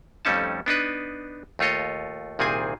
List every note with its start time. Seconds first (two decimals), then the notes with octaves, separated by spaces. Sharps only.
0.25 F2 G3 A3 C#4 D#4 A5
0.66 B3 D4 D#4 B4
1.59 D#2 A3 F4 C#5 D#5
2.39 C2 A#2 D#3 C4 G#4 G#5